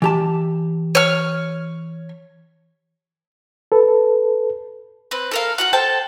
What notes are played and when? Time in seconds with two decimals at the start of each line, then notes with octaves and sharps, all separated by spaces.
0.02 E3 G4 A5
0.95 C#5 F6
3.72 A4 B4
5.11 C4 B4
5.31 A4 A#4 F5
5.58 F4 F#4 F#5
5.73 A4 C5 G5 A5